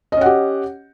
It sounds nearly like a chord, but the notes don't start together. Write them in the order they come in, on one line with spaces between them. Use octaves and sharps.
D#5 C#4 F#5 G4